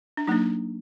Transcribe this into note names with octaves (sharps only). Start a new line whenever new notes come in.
D4
F#3 A#3 D4 D#4